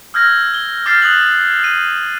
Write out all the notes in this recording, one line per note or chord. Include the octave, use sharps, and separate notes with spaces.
E6 F6 G6 G#6 A#6
G7
D6 F6 G6 A6 C7
D#6 F#6 F#7
D#7